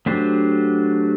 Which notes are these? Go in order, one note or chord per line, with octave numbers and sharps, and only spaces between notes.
F#3 A3 D4 G4 C5